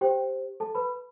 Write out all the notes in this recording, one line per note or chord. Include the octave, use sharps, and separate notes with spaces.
G4 C5 G5
A4 A5
B4 B5